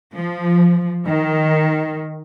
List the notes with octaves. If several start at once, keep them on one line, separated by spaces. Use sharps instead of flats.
F3
D#3